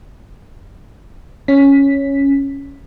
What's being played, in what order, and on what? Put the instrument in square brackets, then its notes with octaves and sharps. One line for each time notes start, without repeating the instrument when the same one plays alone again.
[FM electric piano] C#4 B6